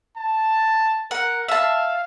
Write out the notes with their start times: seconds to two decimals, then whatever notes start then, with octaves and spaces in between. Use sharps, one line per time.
0.17 A5
1.11 A#4 F#5
1.48 E5 F5 A5